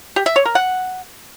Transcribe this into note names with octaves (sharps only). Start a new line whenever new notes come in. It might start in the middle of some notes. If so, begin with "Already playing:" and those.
G4
E5
C#5
A#4
F#5